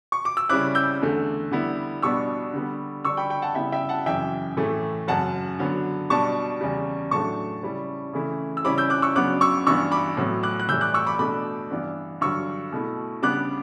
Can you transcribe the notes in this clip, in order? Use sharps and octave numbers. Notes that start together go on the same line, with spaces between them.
C#6
D6
E6
C#3 G3 C#4 E4 D6 F#6
E6 G6
E2 D3 A3
D3 G3 B3 E4
B2 G3 B3 D4 C#6 E6
D3 G3 B3
D3 G3 D4 C#6 E6
G5 B5
G5 B5
F#5 A5
C#3 G3 B3 E4 E5 G5
E5 G5
F#5 A5
F#2 C#3 E3 E5 G5
A2 E3 A3
F#2 C#3 F#3 F#5 A5
D3 F#3 B3
B2 G3 D4 A5 C#6
E2 C#3 G3
A2 F#3 A3 D4 A5 C#6
C#3 G3 C#4 E4
C#3 E3 A3 E4
E6
C#3 G3 C#4 E4 B5 D6
E6 G6
D6 F#6
C#6 E6
C#3 F#3 B3 D4 D6 F#6
C#6 E6
G2 E3 B3 D4 C#6 E6
B5 D6
A2 F#3 B3
D6 F#6
F#6
A2 E3 G3 E6 G6
D6 F#6
C#6 E6
B5 D6
B2 A3 D4 B5 D6
G2 E3 B3 D4
G2 D3 F#3 C#6 E6
B2 A3 E4
C#3 G3 B3 D4 D6 F#6